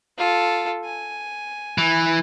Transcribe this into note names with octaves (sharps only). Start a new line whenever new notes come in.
F4 A4
G#5
E3